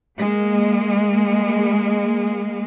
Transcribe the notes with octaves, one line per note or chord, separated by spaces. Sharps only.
G#3 A#3